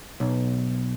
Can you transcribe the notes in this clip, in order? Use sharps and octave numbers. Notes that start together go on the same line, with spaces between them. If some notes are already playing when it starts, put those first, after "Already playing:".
B1